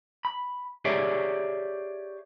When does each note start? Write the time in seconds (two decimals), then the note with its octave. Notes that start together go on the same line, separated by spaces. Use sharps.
0.25 B5
0.85 G4 G#4 C#5 D5 E5